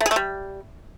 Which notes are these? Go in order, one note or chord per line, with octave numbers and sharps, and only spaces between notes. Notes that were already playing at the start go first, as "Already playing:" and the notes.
A3
G#4
A3
G3